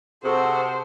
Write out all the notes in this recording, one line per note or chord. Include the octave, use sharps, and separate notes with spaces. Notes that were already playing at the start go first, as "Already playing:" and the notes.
C3 F#4 G#4 A4 C5